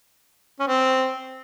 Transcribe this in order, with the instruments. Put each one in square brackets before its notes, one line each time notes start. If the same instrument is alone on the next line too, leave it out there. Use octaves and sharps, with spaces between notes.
[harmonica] C#4
C4